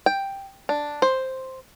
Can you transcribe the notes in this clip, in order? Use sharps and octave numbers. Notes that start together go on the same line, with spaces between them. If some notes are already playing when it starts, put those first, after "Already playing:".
G5
D4
C5